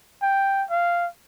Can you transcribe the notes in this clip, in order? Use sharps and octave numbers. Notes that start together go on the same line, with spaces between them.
G5
F5